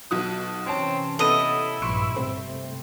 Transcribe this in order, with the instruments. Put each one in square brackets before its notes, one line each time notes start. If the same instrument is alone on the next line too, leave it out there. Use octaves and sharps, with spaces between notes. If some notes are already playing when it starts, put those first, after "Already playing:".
[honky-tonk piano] B1 F#4 D#6
[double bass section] C3 E3 C#4 [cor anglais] C4 [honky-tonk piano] C#5 A5
[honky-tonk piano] B3 A4 D#7 [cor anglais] E4 [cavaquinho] D#5
[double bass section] A#1 G2 [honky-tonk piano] C6 C#6 D7
[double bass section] G1 C3 A3 [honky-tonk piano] C4